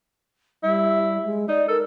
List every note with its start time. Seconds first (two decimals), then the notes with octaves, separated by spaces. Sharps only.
0.63 G3 E4
1.24 G#3
1.49 D#4 D5
1.68 A4 A#4